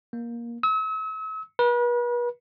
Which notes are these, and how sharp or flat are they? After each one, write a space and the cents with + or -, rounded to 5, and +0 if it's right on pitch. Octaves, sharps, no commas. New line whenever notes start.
A#3 +15
E6 -40
B4 -40